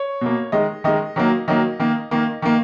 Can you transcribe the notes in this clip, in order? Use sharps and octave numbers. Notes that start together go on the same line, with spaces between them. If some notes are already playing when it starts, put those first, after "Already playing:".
Already playing: C#5
B2 A#3
D#3 G#3 D#5
D#3 G#3 D#5
D#3 F#3 A#3
D#3 F#3 A#3 D#5
D#3 A#3
D#3 A#3
D#3 A#3